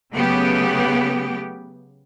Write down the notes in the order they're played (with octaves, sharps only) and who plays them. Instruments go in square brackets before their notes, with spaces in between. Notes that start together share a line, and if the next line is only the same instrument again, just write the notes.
[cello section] C#3 F#3 A3 B3 G4